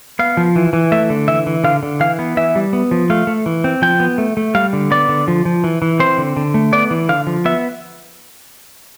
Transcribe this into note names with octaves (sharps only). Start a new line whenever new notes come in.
B3 F5
F3
E3
E3
A3 E5
D3
E3 E5
E3
D3 F5
D3
E3 F5
B3
E3 E5
G3
B3
F3
A3 F5
A3
E3
C4
F3 G5
B3
A3
A3
G3 F5
D3
B3 D5
D3
F3
F3
E3
E3
C4 C5
D3
D3
A3
B3 D5
E3
D3 F5
F3
B3 E5